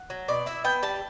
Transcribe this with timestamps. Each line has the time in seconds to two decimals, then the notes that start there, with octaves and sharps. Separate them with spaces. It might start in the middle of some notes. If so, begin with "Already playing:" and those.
Already playing: F#5
0.10 F#3
0.28 B2 D5
0.46 E4 E5
0.64 B3 G5
0.83 G3 A5